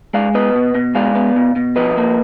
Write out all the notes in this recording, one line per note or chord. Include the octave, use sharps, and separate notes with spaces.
G#3 D5 F5
B3 B4 D#5
B2
B2
G#3 D5 F5
B3
B2
B2
F3 B4 D#5
A#3